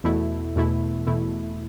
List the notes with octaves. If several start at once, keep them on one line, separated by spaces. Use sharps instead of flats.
E2 B2 A3 E4
E2 B2 A3 E4
E2 B2 A3 E4